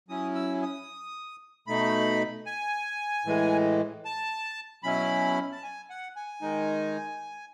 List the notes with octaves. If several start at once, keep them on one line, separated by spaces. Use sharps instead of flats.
F#3 C#4 E4 D#6
E6
D#6
B2 A3 D#4 B5
G#5
A2 E3 G#3
A5
B2 F#3 C#4 E4 B5
A5
G#5
F#5
G#5
D#3 G#3 D#4